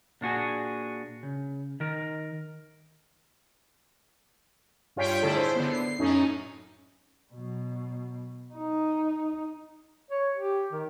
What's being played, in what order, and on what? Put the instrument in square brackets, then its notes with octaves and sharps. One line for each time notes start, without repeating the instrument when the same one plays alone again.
[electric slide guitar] A#2 D4 F#4 G#4
C#3
D#3 A#4
[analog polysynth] G2 F4 C#5 G5 B6 D7
A2 D3 E4 G#4 A4
C5
D3 B3
C7
F#2 A2 C#4 D#4
[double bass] B2 F#3
D#4
[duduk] C#5
G4
D#3